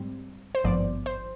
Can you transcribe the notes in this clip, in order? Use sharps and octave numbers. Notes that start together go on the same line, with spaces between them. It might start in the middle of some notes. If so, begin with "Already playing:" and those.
Already playing: G#2 G3 C4
C5
G#1 G2 F3 B3 D5
C5